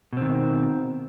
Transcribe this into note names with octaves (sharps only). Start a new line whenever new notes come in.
B2 D#3 C4